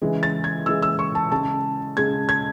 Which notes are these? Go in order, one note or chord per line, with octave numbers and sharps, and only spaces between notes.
C#3 E3 G#3
A6
G#6
C#3 E3 G#3 E6
E6
C#6
A5
C#3 G#3 A5
C#3 G#3 G#6
G#6